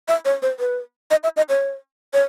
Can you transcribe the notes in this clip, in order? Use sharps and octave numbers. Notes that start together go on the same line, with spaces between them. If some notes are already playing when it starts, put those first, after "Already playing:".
E5
C#5
C5
B4
D#5
E5
D#5
C#5
C#5